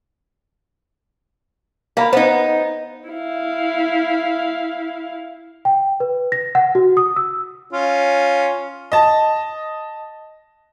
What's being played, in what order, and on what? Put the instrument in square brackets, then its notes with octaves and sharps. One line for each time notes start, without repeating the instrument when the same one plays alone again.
[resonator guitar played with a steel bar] A#3 [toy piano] F5 A#5 B5
[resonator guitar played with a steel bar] B3 D#4 [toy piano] C5
[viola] E4 F5
[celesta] G5
B4
A#6
F#5
F#4
D#6
E6
[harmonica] C#4 F4
[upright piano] D#5 A5